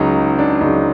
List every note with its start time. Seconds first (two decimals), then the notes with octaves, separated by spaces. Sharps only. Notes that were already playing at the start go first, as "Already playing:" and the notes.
Already playing: C#2 C#3 F#3 D#4
0.39 D4
0.61 C#2 C#3 F#3 D#4